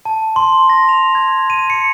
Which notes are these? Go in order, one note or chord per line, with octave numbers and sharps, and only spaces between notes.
A5
C6
A#6
F7
G#6
D#7
C#7